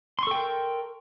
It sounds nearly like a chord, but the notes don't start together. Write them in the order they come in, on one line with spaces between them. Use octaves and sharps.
C6 C#6 A4 G5 A#4